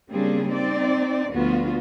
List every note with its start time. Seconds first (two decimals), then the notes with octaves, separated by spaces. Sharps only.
0.11 C#3 G3 A#3 C4 D4 G#4
0.50 C4 D#4 D5
1.31 D2 D3 F3 B3 F4 F#4